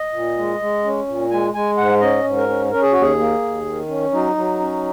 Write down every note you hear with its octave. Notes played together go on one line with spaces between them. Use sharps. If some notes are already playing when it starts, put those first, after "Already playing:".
Already playing: D#5
A#2
G#3
G#3
C#4
A#2
G#3 G#5
G#3 G#5
G#2 F#5
C#4 D#5
G#2
A#4
C#4
C#4 A#4
G#4
D#2 F#4
G#4
A#3
D#2
D#3
C#4
F#3 D#4
F#3
C#4